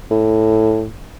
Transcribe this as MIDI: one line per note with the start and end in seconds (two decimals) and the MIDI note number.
0.11 0.88 45